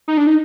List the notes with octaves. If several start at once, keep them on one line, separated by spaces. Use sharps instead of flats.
D#4
D4
D#4